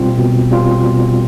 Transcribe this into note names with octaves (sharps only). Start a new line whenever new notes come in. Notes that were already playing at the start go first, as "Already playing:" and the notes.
Already playing: B2 G3 C4 F4
B2
G3 C4 F4
B2